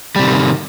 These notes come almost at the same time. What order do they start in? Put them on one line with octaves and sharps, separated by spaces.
G3 C3 D#3